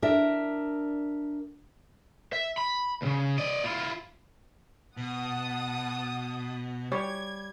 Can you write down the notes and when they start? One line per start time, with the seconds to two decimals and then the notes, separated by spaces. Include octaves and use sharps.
0.02 D4 A#4 E5
2.33 E5
2.58 B5
3.02 D2 C#3
3.38 D5 D#5
3.64 E4 F4
4.97 B2 F#5 A5 D#6
6.92 G3 C#5 G#6